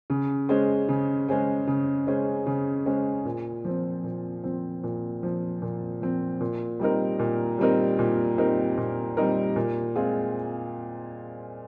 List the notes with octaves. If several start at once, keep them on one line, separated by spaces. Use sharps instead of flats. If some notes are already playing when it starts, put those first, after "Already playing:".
C#3
G#3 C#4 G#4 C5
C#3
G#3 C#4 G#4 C5
C#3
G#3 C#4 G#4 C5
C#3
G#3 C#4 G#4 C5
A#2
F3 C4
A#2
F3 C4
A#2
F3 C4
A#2
F3 C4
A#2
G3 C4 D#4 A#4
A#2
G3 C4 D#4 A#4
A#2
G3 C4 D#4 A#4
A#2
G3 C4 D#4 A#4
A#2
G#3 C4 F4 G#4